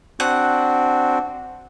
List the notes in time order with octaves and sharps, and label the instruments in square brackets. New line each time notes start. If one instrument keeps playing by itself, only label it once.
[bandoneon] C4 D4 F#4 [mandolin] F#5